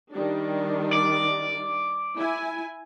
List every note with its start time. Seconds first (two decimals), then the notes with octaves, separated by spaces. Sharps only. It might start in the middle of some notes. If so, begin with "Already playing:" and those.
0.12 D#3 G3 D4
0.93 D5
2.17 E4 G#5